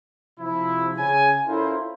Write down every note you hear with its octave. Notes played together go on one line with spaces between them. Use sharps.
C3 F3 E4
C#3 G#5
C#4 E4 F4 A4 A#4 C5